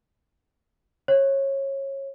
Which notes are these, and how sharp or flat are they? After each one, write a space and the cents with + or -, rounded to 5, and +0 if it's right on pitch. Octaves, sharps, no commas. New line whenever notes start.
C#5 -20